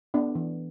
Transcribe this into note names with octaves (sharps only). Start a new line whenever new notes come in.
B3 D4
E3